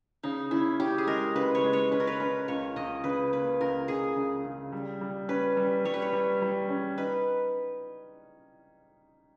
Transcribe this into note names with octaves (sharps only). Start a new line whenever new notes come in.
C#3 D#4
C#4 E4
C#4 G4
G#4
G#3 A#4
C#3 B4
C#5
G#3
C#5
C#4 B4
A#4
B4
C#4 A#4
C#2 C#5
C#2 D#5
C#3 B4
A#3 B4
C#2 A#4
C#2 G#4
C#3
C#3
G3
G3
C#4 B4
G3
G3 C#5
B4
C#5
G3
G3
C#4
D#4 B4